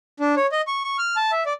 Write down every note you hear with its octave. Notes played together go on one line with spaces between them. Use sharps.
D4
C#5
D#5
C#6
C#6
F6
A5
E5
D5